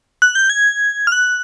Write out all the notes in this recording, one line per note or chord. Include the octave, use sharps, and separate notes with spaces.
F#6
G6
G#6
F6
F#6